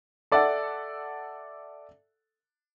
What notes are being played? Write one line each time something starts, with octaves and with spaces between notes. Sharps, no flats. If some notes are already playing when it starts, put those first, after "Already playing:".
A4 D5 E5 F#5